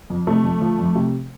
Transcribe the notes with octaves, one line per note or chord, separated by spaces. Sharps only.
F2
C3 A3
F2
F3
F2
C3